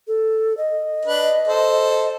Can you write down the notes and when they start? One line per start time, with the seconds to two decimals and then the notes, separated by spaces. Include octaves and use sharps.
0.08 A4
0.57 D#5
1.05 D4 B4
1.48 A4 C5